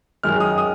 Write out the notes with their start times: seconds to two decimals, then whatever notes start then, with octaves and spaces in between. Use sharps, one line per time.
0.23 F#2 D#3 G#3 F6
0.40 D#6
0.58 D#6